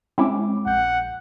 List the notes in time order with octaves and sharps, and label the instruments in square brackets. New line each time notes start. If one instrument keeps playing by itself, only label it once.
[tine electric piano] G#3 D6 [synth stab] C4 C#4 E4
[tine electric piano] A#1 G6 [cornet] F#5